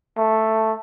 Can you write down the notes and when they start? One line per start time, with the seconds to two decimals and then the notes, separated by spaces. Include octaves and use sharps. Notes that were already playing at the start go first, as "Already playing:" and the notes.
0.18 A3